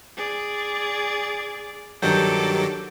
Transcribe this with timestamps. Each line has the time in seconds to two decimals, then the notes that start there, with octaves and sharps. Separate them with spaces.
0.17 G#4 D5
2.02 G2 D#3 F#3 G4 A4 D6